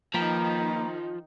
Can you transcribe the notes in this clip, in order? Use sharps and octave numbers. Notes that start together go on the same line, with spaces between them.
D#3 F3 A#3 D#4 B4 G5 A#5